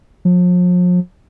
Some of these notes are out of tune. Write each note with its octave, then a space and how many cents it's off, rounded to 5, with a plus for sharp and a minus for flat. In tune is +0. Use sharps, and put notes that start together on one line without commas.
F3 +40